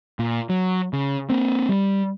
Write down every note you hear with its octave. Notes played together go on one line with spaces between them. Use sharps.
A#2
F#3
C#3
A#3 C4
G3